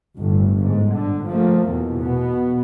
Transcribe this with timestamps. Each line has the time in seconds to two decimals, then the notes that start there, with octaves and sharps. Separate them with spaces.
0.19 G1 A2
0.63 G#2
0.96 D3
1.29 F3 A3 A#3
1.69 E2 B2
1.99 B2 B3